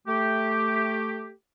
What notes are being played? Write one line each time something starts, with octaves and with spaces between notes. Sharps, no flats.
A3 G4